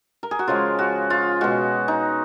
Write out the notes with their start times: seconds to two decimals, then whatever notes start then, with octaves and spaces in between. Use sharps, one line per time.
0.23 A#4
0.31 G#4
0.39 F#4
0.48 C#3 F3 G#3 F4
0.79 F#4
1.10 F4
1.41 B2 G#3 F#4
1.88 D#4